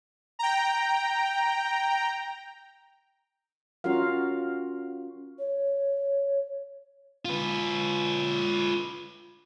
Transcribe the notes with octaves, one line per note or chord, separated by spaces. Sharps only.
G5 A#5
C#4 F4 F#4 A#4 F5
C#5
F4 B4